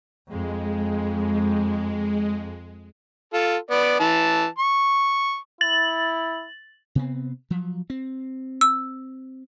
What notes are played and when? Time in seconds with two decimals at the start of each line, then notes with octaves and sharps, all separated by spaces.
0.29 F2 G#3
3.34 F4 A4
3.71 B3 D5
4.00 E3 A5
4.59 C#6
5.61 E4 A6 F#7
6.95 C3 B3 C4
7.50 F3 F#3
7.90 C4
8.61 E6